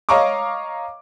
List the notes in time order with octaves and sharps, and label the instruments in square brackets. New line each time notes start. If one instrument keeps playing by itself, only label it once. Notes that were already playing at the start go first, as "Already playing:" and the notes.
[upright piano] C#5 D#5 F5 A#5 C#6 D6